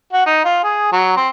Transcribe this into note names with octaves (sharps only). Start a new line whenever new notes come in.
F#4
D#4
F4
G#4
F#3
C4